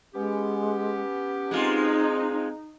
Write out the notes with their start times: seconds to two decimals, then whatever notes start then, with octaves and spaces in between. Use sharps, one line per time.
0.15 G#3 B3 C#4 G4
1.51 G#3 C4 D#4 F4